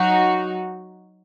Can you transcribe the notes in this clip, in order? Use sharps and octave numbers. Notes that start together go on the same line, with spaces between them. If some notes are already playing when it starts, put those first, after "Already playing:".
Already playing: F#3 D#4 F#4